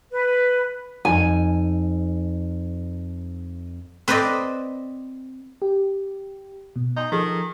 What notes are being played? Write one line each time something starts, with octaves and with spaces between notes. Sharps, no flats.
B4
F2 D#4 G#5
C4 B4 C5 D5 D#5
G4
B2
D#4 G#5 C6 G6
D#3 F3 G#4 A4